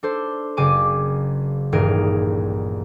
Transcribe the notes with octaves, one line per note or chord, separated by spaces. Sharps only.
D4 A4 C5
F#1 C#3 G#5 D6 D#7
D#1 A1 G2 G#4 A#4 D7